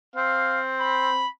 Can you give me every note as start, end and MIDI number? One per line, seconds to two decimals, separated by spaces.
0.16 1.23 60
0.16 0.60 77
0.80 1.27 83